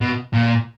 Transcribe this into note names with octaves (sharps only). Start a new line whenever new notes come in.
B2
A#2